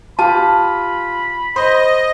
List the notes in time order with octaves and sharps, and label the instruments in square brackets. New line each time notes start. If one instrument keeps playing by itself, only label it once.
[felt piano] F4 G4 [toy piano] A5 [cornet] B5
[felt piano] C5 [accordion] D#5